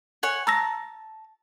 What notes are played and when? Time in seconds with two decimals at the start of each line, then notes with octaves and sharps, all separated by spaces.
0.23 C#5 F#5 G#5
0.47 A5 A#5 E6 A#6